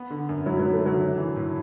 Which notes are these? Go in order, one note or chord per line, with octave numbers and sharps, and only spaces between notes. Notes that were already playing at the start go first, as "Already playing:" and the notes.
Already playing: B3
D3
F#2
F#3 E4
F#3
B3
A3
D3 F#3
D4
E3
A2